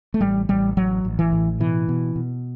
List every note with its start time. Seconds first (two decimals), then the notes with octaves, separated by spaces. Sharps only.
0.14 A3
0.21 A1 G3
0.49 A1 G3
0.77 A1 F#3
1.05 A1
1.19 E3
1.32 A2
1.60 B2 E3
1.89 B2
2.16 B2